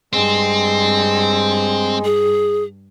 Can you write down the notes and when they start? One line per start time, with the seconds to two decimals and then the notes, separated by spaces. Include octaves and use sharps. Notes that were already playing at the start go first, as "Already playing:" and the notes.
0.13 G2 G#3 C4
2.05 G#4